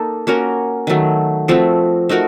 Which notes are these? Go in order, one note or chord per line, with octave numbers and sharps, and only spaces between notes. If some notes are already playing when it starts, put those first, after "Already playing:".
Already playing: A#3 D#4 A4
A#3 C#4 F#4 A#4
D#3 F#3 A3
F3 A3 C4 F#4
A3 D#4 F#4 A#4